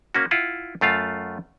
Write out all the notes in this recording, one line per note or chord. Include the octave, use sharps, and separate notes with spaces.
A#3 C#4 F#4
E4 F4 E5 F#5
F#2 A3 F4 F5